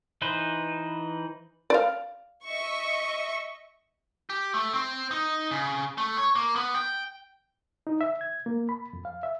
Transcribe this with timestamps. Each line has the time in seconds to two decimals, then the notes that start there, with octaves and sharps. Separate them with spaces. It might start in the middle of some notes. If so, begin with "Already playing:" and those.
0.22 E3 D#4 B4 C5
1.70 D5 F5
2.45 D#5 E5 C#6
4.30 G4
4.54 A3
4.73 C4
5.11 D#4
5.51 C#3
5.98 A3
6.18 C#5
6.36 A#3
6.56 B3
6.75 G5
7.87 D#4
8.01 E5
8.21 G#6
8.46 A#3
8.69 B5
8.93 F2
9.05 F5
9.23 E5